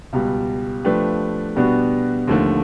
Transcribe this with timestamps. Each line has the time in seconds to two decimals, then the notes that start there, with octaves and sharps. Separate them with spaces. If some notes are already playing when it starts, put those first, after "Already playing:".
0.13 C#2 B2 G3
0.84 F3 A3 D4 G4 B4
1.56 B2 G3 B3 D4 F#4
2.27 D#2 D3 F3 A3